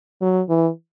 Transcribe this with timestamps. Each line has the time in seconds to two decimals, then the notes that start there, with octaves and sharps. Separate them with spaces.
0.21 F#3
0.49 E3